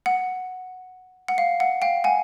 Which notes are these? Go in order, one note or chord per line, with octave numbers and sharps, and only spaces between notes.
F#5
F#5
F5
F#5
F5 G5
F#5 G#5